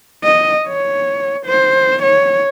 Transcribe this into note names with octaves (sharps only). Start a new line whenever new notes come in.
D#5
C#5
C5
C#5